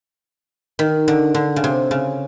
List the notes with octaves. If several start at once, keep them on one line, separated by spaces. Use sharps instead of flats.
D#3
D3
D3
C#3
C3
C#3